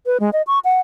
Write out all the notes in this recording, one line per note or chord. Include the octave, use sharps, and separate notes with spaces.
B4
G#3
D#5
C#6
F#5